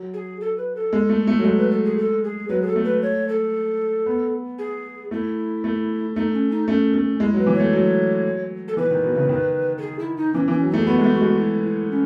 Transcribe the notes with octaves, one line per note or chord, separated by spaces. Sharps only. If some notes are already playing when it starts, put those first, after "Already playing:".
Already playing: F#3
G#4
A4
B4
A4
G#3
A3
A3
F#3
G#3 A4
B4
A4
G#4
A4
G#4
F#3 B4
G#4
A4
A3
B4
C#5
A4
B3
G#4
A3 E4
A3
A3 D#4
C#4
D#4
A3 C#4
A3
G#3 E4
F#3
B4
E3
A3 C#5
F#3
A4
E3 B4
D#3
B2
C#3
D#3
A4
G#4
E4
D#4
E3 C#4
E3 C#4
F#3
A3 D#4
G#4
B3 F#4
G#3
A3
F#4
G#3
E4
E4
C#4